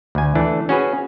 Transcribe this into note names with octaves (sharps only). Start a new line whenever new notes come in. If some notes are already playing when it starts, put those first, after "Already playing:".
D2 G#5
E3 A3 D4
C#4 F#4 G#4 B4